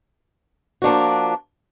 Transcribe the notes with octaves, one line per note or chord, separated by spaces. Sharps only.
F3 A#3 D4 F#4